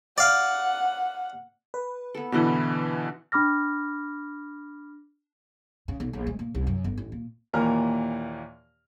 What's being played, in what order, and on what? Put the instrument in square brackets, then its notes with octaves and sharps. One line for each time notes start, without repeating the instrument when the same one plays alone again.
[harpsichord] D5 F5 [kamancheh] F#5
[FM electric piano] B4
[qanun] B3 A4
[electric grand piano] B2 D3 E3 [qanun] B3 E4 D#5
[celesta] D4 B5 D6 F6 A#6
[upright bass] C#3
B1
A#1
G#3
A#2
C2
F#2
G1
A1
A#2
[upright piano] D#2 A#2 E3 A#4 A#5 F6